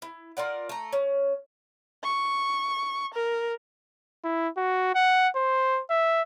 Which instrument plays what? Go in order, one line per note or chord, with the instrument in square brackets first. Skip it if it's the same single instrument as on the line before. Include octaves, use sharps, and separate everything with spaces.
[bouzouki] E4
F4 A#4 D5 F#5
A3 A#5
C#4
[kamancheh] C#6
A#4
[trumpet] E4
F#4
F#5
C5
E5